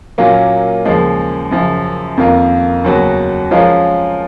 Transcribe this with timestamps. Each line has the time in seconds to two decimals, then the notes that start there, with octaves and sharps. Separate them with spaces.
0.18 A#2 F#3 A#3 C#4 F4
0.85 D#2 C#3 F3 G#3
1.51 F#2 C#3 F3
2.17 F2 D#3 A#3 F4 A#4
2.84 D#2 C#3 F#3 B3 F#4
3.51 F3 G#3 C#4 F4 A#4